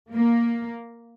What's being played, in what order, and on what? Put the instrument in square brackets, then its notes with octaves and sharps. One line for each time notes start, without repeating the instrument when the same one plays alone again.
[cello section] A#3